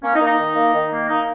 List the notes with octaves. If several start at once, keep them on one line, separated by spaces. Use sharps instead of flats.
A#3 C#4
D#4
A#3
D#4
D#3
A#3
D#3
A#3
A#3 D#4